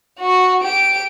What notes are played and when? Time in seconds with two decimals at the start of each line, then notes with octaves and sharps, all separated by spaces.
0.19 F#4
0.63 G4 D7